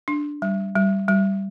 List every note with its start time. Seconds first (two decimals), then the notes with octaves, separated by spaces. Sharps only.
0.08 D4
0.42 G3
0.76 G3
1.08 G3